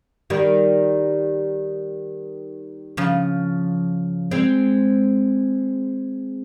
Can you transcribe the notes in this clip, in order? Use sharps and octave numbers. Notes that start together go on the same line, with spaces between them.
D#3 G3
C#3 F3
G#3 C4